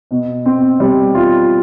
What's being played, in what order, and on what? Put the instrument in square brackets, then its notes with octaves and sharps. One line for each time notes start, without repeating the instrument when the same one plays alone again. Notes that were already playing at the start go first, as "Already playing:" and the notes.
[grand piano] B2
C4
G3
F4